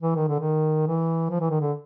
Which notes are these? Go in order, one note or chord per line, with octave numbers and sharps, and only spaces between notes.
E3
D#3
D3
D#3
E3
F3
E3
D#3
D3